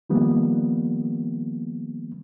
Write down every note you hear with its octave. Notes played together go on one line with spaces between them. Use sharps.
D#3 F3 G3 A#3 B3